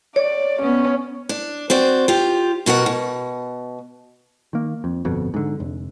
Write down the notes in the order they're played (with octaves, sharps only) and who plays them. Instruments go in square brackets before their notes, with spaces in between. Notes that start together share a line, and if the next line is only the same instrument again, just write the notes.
[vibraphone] C#5 [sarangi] D5
[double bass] B3 [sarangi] C#4
[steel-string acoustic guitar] D4
C4 F#4 D5
F4 G4
B2 F#4 A#4 F#5
B2
[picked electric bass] D#3 A#3
F2
G1 F2 B2
G#2 D3
F1